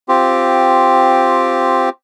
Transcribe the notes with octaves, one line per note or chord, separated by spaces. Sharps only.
C4 F4 G4